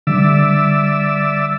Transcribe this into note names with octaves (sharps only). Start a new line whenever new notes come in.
D3 G3 D5 E5 E6